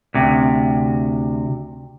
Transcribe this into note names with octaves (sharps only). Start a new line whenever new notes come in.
D2 C3